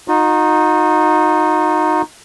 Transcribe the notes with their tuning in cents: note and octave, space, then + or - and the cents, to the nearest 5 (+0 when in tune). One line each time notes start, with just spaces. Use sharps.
D#4 +0 F#4 -45